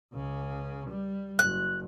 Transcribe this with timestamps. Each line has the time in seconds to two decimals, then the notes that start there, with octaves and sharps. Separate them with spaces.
0.13 C#2 C#3
0.89 G3
1.39 F#1 F#6